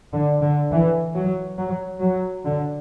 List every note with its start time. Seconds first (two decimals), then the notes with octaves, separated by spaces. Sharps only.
0.13 D3
0.42 D3
0.71 E3
1.15 F#3
1.57 F#3
2.01 F#3
2.44 D3